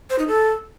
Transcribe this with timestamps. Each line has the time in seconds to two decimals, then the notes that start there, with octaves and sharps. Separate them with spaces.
0.10 C5
0.19 D#4
0.28 A4